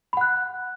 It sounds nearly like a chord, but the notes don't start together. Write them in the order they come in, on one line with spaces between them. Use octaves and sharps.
B5 F#5 F#6